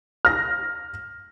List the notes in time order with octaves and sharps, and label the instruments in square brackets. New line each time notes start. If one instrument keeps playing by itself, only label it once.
[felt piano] F6 A#6